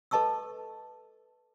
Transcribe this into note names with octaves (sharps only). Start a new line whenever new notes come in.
A4 B4 D#5 A5 C#6 E6